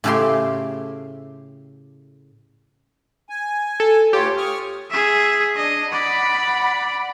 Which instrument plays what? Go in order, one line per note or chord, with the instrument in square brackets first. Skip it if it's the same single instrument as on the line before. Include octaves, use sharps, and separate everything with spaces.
[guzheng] A2 C#3 A3 E4 G4 C6
[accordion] G#5
[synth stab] A4
[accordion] D2 F4 C#5 [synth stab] G4
[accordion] C#6 D#6 F6
[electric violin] G#4 E5
[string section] D4 [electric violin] D#5
[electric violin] D5 [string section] F#5 B5